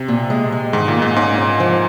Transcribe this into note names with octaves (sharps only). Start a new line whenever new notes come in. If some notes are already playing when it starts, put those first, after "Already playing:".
Already playing: C3
A#2
G#3
G#3
G#2 D#3
A#2
A#3
G#2
G#2 C#4
C#4
F3